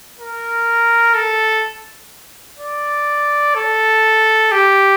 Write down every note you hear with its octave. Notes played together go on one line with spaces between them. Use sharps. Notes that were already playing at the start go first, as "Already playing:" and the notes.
A#4
A4
D5
A4
G4